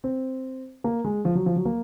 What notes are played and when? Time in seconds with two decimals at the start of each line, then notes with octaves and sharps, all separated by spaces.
0.04 C4
0.84 A#3
1.05 G#3
1.25 F3
1.35 F#3
1.46 F3
1.56 F#3
1.65 A#3